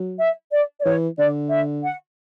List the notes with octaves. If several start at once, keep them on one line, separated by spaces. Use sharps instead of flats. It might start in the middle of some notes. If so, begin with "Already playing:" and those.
Already playing: F#3
E5
D5
D5
E3 C#5
D3 D5
E5
F#5